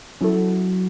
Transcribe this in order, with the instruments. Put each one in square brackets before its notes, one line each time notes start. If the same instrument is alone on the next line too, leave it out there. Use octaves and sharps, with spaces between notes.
[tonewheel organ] F#3 [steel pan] C#4 E4 A4